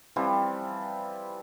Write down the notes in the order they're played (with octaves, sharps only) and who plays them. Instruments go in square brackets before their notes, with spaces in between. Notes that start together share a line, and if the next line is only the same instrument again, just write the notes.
[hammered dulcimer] E3 F3 G3 C4